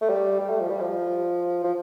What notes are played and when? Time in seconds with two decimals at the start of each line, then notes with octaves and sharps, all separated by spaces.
0.01 A3
0.10 G3
0.40 G3
0.49 A3
0.60 F3
0.70 G3
0.80 F3
1.64 F3